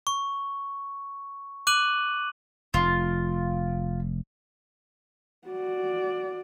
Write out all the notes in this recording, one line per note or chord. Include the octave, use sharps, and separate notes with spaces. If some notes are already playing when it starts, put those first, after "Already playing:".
C#6
D6 F#6 D#7 F#7
F1 F4
F#4 D5